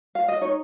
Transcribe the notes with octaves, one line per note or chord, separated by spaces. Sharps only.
F5
D#5
D#4 C#5